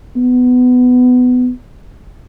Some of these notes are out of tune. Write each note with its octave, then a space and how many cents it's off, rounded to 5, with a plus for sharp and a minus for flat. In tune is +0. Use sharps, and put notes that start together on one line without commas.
B3 +20